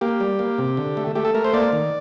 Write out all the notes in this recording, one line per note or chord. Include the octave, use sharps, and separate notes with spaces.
A#3 G4
G3
A#3
C3
D3
A3
A3 G4
A4
A3 A#4
C5
A#3 D5
D#3